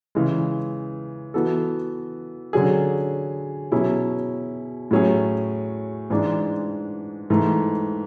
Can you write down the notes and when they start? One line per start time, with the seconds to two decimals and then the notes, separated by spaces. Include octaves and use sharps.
0.15 C#3 E3 G#3
1.34 E3 B3 F#4 A4
2.53 D3 F#3 C#4 G#4
3.72 B2 F#3 C#4 E4 G#4
4.91 A2 F#3 C#4 G#4
6.10 G#2 E3 G#3 D4
7.30 G#2 E3 A3